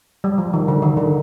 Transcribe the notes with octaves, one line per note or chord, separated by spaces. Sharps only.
G3
F3
D#3
D3
D#3
D3